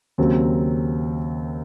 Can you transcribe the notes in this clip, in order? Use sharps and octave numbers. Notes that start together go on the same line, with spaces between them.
D#2 C#3 F#3 C4